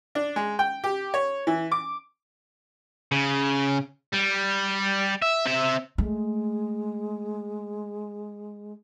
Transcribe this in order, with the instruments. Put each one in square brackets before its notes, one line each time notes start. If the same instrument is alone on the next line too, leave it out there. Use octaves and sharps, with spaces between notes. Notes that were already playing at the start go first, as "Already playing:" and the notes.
[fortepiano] D4
G#3
G5
G4
C#5
E3
D6
[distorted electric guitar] C#3
G3
E5
C4 E5
[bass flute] G#3 [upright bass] A3